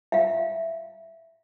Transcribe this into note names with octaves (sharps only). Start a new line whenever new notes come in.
E5 F5